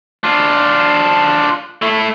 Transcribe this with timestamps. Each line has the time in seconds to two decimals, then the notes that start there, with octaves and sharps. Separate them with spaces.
0.24 D4 F4
1.82 A3 E4